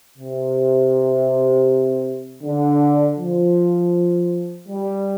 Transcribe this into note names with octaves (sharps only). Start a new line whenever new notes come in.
C3
D3
F3
G3